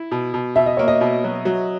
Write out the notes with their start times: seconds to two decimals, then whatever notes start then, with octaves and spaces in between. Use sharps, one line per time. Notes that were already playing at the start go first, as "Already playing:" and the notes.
Already playing: E4
0.12 B2
0.34 B2
0.56 B2 E5
0.66 D#5
0.77 A#3 C#5
0.88 D#5
1.01 B2
1.24 F#3
1.45 F#3